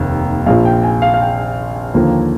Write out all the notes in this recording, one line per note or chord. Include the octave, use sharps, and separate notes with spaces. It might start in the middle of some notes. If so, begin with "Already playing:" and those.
Already playing: F1 D#2
A#1 A#2 F3 F5
G5
G#5
F5
F5
G5
D#2 D3 F3 A#3